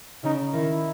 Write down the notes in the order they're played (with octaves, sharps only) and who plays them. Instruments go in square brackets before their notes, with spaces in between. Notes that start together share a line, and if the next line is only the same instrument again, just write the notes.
[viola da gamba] C#3 [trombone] D#4
[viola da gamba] D#3 [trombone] E4